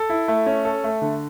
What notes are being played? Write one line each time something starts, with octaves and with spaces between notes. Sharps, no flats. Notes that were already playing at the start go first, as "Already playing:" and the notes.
Already playing: A4
E4
A3
C#4
A4
A3
D3